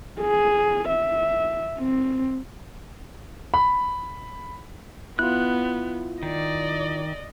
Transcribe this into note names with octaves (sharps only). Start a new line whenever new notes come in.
G#4
E5
C4
B5
B3 E4 F4 F#6
D#3 D5 D#5